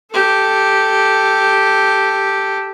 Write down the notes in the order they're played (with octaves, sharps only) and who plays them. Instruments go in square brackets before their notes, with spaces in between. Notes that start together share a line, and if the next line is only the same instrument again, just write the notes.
[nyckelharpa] G4 A4